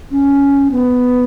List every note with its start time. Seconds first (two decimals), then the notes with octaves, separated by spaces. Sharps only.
0.12 C#4
0.72 B3